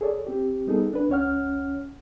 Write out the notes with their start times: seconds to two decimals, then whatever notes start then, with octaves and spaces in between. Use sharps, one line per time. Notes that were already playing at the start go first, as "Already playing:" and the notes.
0.01 G#4 A4 C#5 D5
0.27 C4 G4
0.67 G3 B3 D#4 G#4 A4
0.93 D4 B4
1.09 C#2 C#4 C#5 F#5 F6